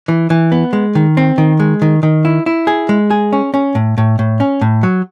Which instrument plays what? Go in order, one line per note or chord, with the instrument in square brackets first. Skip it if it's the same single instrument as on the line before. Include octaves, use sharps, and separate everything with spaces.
[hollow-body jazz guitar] E3
E3
B3
G#3
D#3
C4
D#3
G#3
D#3
D#3
E4
E4
G#4
G#3
G#4
C#4
C#4
A2
A2
A2
C#4
A2
F#3